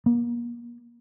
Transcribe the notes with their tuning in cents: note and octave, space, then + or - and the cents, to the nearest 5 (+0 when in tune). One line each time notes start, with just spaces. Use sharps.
A#3 +35